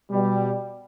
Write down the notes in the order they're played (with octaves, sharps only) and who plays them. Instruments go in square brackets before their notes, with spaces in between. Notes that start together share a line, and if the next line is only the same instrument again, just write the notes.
[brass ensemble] B2 G3